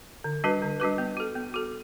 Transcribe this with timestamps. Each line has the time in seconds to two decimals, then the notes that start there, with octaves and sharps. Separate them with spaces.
0.24 D3
0.44 G3 D4 F#4 B4
0.62 D3
0.80 G3 D4 F#4 B4
0.98 B3
1.17 F#4 A4
1.36 B3
1.54 F#4 A4